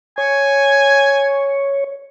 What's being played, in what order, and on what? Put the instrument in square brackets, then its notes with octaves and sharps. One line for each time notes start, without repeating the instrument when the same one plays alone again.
[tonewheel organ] C#5 [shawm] G#5